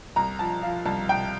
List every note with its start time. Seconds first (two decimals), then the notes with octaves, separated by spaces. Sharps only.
0.16 C2 A#5
0.39 F3 A5
0.62 F3 F5
0.86 C2 A5
1.09 C2 G5